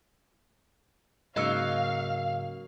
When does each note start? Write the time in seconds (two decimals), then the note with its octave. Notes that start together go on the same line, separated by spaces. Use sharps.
1.36 G#2 C#3 F#3 A#3 D#5 F5 E6 C#7